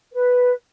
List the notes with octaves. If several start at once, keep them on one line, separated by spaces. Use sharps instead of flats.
B4